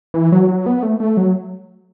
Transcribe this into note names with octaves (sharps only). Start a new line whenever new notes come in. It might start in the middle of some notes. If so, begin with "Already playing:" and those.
E3
F#3
F#3
B3
A3
A3
F#3